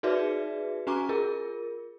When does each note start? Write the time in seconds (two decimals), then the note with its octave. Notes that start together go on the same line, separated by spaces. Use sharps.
0.03 D#4 F#4 G#4 B4 D5 E5
0.87 C#4 F#4 G#5 A#5 C#6 D6
1.09 F4 G#4 A#4